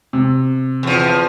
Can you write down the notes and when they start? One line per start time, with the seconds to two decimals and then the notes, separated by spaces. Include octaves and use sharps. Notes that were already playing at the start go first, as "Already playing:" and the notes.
0.13 C3
0.83 E2 F3